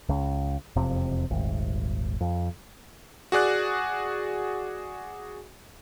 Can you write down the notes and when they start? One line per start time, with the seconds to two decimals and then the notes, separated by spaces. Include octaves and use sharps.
0.09 C#2
0.76 E1 F2 C3
1.30 D#1 G#1
2.21 F2
3.32 F#4 G#4 D5 F#6